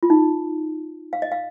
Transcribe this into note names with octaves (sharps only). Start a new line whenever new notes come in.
F4
D#4
F5
D#5
F5